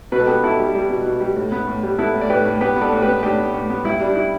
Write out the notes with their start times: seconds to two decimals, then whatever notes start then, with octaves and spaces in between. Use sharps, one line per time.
0.12 B2 B4
0.20 A4
0.26 B3 G4 B4
0.43 B2 E4 A4
0.59 G3
0.75 G3
0.90 B2
1.06 B2
1.21 G3
1.36 A2
1.52 B3
1.67 A2
1.83 G3
1.98 B3 E4 A4
2.14 A2
2.21 D5
2.30 A2 G4 B4
2.45 A2
2.61 B3 G4 B4
2.76 B3
2.81 A4 D5
2.92 A2
3.02 G4 B4
3.08 B3
3.23 A2 D4 G4
3.38 B3
3.54 A2
3.70 B3
3.84 G2 E4
4.00 G3 D4
4.15 E4